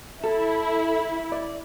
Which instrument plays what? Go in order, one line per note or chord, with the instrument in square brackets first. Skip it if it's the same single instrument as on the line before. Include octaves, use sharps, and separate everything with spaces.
[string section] E4 [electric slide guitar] A4
[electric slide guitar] D5